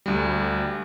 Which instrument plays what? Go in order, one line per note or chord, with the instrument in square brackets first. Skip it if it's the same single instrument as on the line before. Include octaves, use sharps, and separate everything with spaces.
[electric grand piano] D2 G3